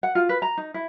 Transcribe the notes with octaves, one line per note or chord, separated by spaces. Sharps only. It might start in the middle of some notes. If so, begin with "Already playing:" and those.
F#5
F4
B4
A#5
D#4
E4